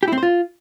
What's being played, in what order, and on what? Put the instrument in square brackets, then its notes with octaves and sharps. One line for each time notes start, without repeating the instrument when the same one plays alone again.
[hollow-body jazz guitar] G4
E4
C4
C5
F4